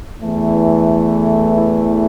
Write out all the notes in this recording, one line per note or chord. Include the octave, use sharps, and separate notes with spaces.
E2 E3 A3
E4